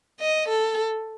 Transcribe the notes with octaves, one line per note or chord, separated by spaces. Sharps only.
D#5
A4